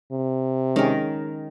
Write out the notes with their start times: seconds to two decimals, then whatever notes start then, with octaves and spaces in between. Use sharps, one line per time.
0.12 C3
0.76 D#3 G#3 C#4 G#4 A#4